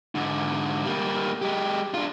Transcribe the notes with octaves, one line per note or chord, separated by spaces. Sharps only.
G#2 D3
G3 A#3
G#3 G4
D4 F4